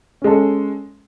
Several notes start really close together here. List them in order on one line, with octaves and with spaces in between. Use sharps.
C#4 G#3 A4